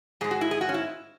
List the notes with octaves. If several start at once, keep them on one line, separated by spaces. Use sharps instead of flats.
G#2 G#3 G#4
F#4
E4
G#4
F#4
C#4
E4